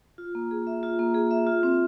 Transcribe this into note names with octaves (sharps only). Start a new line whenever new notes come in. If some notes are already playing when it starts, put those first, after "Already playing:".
F4
A#3
G#4
E5
F4
A#3
G#4
E5
F4
C4